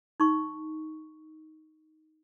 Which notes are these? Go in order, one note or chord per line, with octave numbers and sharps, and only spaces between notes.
D#4 C#6